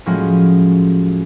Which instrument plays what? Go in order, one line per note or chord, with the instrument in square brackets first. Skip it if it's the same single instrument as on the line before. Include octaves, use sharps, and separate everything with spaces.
[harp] A2 F3 F#3 G#3 A#3 C#4